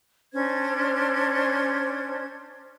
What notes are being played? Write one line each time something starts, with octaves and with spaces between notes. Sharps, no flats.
C#4 D4 C5 G#6